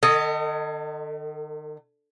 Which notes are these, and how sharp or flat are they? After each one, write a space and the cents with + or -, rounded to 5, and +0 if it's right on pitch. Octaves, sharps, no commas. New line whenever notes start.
D#3 -40 A4 +35 D#5 +0